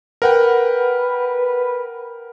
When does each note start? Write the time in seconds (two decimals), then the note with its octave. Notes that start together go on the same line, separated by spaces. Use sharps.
0.22 A#4 B4 F#5 G5